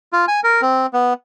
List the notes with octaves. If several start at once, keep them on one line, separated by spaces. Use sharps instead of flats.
F4
G#5
A#4
C4
B3